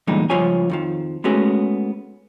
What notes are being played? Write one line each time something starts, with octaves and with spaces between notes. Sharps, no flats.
E2 A#2 D3 G3 G#3 D#4
C#2 G2 F3 F4 C#5 G#5
F2 D#3 F3
G#3 A3 B3 C#4 F#4 G#4